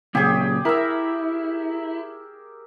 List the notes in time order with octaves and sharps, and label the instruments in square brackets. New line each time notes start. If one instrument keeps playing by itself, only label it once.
[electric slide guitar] A#2 C#3 F#3 [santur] G4 G#4
[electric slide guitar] E4 [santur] A#4 E5